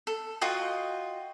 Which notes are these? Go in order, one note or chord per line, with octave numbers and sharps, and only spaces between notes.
A4
F4 F#4 D#5 G5